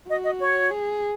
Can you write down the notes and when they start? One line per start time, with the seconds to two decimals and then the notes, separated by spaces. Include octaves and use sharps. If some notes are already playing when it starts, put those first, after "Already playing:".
0.09 F#4 D#5
0.24 D#5
0.39 C#5
0.70 G#4